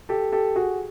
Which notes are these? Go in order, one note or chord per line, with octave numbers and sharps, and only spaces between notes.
G4 A4
G4 A4
F#4 G#4